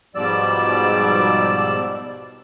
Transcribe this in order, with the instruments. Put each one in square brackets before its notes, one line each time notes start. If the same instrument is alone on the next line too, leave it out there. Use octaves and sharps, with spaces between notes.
[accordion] G#2 B2 F3 G3 D5 E6